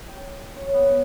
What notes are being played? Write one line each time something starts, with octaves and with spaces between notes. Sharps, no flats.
G5
C#5
B3